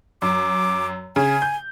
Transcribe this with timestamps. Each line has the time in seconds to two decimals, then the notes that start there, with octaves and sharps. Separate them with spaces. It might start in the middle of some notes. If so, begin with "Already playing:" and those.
0.22 F#2 D6
1.16 C#3 G#5
1.42 G6